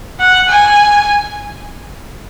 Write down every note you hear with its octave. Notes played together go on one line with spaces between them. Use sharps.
F#5
G#5